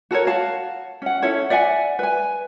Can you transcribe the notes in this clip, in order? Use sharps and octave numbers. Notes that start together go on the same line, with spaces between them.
F#4 A4 A#4 C#5
F#4 F5 A5
C#4 F#5
C#4 E4 A4 C#5
D5 E5 F#5 G#5
B4 G#5